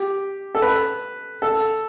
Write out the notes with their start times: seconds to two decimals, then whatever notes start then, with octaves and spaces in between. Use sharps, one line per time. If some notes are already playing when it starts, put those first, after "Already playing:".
Already playing: G4
0.55 A4
0.62 B4
1.42 A4